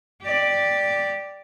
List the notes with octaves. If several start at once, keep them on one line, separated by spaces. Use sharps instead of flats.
G4 D5